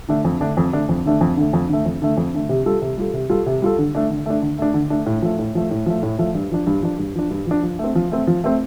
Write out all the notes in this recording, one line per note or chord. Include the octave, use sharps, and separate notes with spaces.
D3 A3 D4
F2
D3 A3 D4
F2
D3 A3 D4
F2
D3 A3 D4
F2
D3 A3
F2
D3 A3
F2
D3 A3
F2
D3 A3
C3
G3 F4 A4
C3
G3 F4 A4
C3
G3 F4 A4
C3
G3 F4 A4
D3
A3 D4
D3
A3 D4
D3
A3 D4
D3
A3 D4
A2
F3 A3
A2
F3 A3
A2
F3 A3
A2
F3 A3
G2
F3 D4
G2
F3 D4
G2
F3 D4
G2
F3 D4
F3
A3 C4
F3
A3 C4
F3
A3 C4